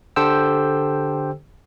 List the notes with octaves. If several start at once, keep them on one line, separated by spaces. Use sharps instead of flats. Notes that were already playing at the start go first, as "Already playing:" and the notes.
D3 G4 A4 C5 G5 E6